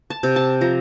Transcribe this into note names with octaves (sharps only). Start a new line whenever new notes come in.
A5
C3
A5
F3 A#5